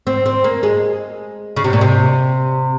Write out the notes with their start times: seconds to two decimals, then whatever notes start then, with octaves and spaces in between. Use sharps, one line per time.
0.07 C4
0.26 C4
0.44 A#3
0.63 G#3
1.56 C#3
1.64 C3
1.73 A#2
1.81 C3